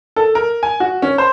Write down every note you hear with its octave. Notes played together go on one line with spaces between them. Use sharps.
A4
A#4
G#5
F#4
C#4
C5